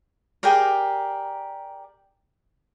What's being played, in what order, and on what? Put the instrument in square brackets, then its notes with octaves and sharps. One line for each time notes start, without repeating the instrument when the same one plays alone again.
[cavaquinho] G4 G#4 A#4 D5